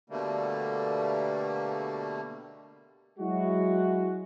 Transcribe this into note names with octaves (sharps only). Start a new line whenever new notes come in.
B2 D3 G3 A3 A#3
F#3 G#3 E4 F#4